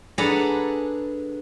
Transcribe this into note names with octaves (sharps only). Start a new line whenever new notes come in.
D4 G#4 A4 B4 F#5 A#5